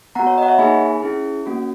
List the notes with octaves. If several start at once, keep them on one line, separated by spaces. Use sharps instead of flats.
B3 F#4 F#5 A#5
C#5
D#5
F#5
C#5 E5
A#3 D#4 G#4 G#5 B5
C#4 E4 G#4
A#3 C#4 F#4